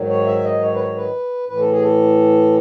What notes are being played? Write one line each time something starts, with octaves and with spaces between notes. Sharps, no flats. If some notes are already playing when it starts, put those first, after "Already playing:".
Already playing: G#2 D#3 F#3
C#5
E5
D#5
C#5
B4
C#5
B4
A2 E3 B4
A4
G#4
A4